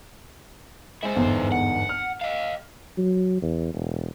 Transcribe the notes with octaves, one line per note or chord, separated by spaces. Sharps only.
G#3 E4 C5
G1 E2 G#2
F#5
F6
D#5 F5
F#3
E2
E1